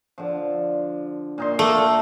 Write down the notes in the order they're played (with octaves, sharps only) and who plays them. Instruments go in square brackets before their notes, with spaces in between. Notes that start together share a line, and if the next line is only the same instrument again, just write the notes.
[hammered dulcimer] D3 F3
A#2 D#4 C6
[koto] A3 [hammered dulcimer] A#3